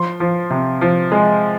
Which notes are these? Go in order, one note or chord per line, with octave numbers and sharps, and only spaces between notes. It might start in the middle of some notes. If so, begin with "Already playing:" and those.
Already playing: F3 C6
F3
C3
F3
G#3